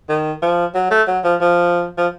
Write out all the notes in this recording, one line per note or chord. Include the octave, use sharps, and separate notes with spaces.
D#3
F3
F#3
A3
F#3
F3
F3
F3